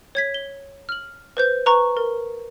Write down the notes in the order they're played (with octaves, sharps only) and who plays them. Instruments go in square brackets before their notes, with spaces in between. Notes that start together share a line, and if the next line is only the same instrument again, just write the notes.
[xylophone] C#5 G#6 B6
G7
F6 F#7
B4 C5 G6
B4 A#5 C#6
A#4